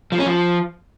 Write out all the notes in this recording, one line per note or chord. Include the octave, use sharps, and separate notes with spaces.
F3
C#4
F3